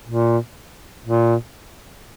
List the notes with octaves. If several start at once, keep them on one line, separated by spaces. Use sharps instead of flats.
A#2
A#2